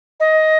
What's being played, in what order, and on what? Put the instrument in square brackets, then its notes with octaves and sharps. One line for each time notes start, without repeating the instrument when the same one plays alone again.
[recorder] D#5